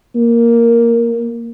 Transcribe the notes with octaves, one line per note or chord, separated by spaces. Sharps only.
A#3